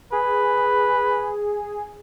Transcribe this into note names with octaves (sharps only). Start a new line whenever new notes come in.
G#4 B4